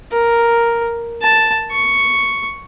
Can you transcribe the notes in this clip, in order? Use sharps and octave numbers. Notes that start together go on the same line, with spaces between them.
A#4
A5
C#6